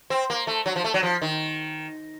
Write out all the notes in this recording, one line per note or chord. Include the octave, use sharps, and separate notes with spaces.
C4
A#3
A3
F#3
F3
A3
F#3
F3
D#3